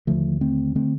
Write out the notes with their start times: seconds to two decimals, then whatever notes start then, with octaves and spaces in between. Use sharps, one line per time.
0.07 D#2 D3 F3 A3
0.41 A3 C4
0.75 D3 A3 C4